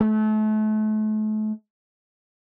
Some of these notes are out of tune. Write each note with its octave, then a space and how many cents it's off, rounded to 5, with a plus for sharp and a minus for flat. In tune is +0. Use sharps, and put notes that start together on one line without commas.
A3 -35